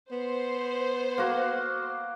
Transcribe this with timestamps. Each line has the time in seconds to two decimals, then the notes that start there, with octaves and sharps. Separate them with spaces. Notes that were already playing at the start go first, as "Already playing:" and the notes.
0.11 B3 C5
1.18 A#3 F#4